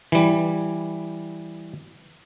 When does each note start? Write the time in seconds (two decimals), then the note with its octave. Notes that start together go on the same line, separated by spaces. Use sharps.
0.12 E3 G3